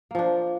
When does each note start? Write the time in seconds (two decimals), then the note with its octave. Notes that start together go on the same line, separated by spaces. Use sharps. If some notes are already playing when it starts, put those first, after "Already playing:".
0.11 A#3
0.15 F3
0.19 D4